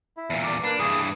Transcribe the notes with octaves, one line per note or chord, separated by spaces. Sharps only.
E4
E2 A#2
D5
A#3 D4 B4 F#6
G2 E3 G#4 D#6